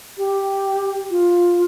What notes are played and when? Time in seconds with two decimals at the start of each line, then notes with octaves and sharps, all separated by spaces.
0.18 G4
1.11 F4